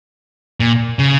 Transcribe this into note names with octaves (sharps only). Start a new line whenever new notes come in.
A#2
C#3